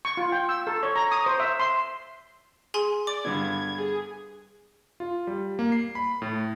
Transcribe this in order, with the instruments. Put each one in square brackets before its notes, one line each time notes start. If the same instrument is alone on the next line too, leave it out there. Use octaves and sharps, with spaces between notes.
[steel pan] C#6
F4
G5
E6
A4
C#5
A#5
D#6
C5
E5
C6
[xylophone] G#4 G#5 C6
[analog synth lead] D5 [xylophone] D6
[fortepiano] G2 D3 B3 [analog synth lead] G#6
[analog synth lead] G#4
[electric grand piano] F4
G3
A#3
C7
B5
A2